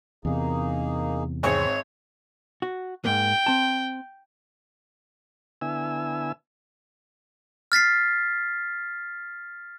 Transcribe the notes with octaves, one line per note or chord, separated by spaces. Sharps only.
E2 C3 A#3 D#4 G#4
G#1 C4 G#4 C#5
F#4
G#2 A#3 G5
C4 A5
D3 B3 E4 G#5 E6
F6 A6 B6 C7